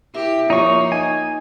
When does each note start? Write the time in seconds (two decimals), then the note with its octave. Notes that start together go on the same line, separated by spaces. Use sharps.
0.15 E4 G4 A#4 E5
0.50 F3 A#3 D#4 C#5 C#6 A#6
0.92 D#4 D#5 G#5